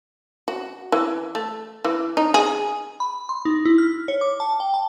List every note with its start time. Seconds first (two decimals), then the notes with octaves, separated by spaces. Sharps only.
0.48 F#4
0.92 E3
1.35 A3
1.85 E3
2.17 D#4
2.34 G#4
3.00 B5
3.29 C6
3.45 D#4
3.65 E4
3.78 F6
4.08 C#5
4.21 D6
4.40 A5
4.60 G5
4.74 A5